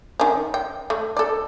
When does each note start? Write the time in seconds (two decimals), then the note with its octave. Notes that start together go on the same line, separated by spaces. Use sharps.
0.20 D#3 C#4
0.54 G5
0.90 A3
1.17 A4 D5